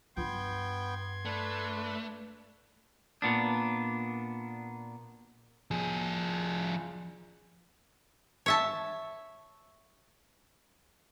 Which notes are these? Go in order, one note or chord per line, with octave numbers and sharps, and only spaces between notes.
G2 B3 F4 G5 C6 G6 G#6
A3 D4 B4
A#2 B3 D4
F3 G#4
C#5 E5 A5